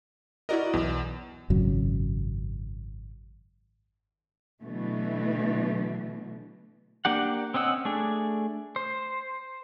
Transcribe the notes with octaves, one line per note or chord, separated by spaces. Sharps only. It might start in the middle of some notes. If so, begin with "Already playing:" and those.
E4 F#4 A#4 D5 D#5
B1 E2
G#1 F#2 C#3 F#3
B2 D3 E3 F#3 A3
A#3 D4 G4 F#5
C4 C#4 D#5 F#5 E6
A3 D4 G#4
C5